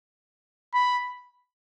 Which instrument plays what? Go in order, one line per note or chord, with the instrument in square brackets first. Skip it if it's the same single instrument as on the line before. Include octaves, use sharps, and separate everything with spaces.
[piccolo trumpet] B5